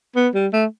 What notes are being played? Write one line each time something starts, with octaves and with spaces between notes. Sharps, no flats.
B3
G3
A3